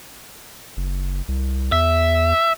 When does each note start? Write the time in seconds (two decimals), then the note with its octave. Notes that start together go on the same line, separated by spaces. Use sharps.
0.77 F#1
1.28 C2
1.72 E2 E5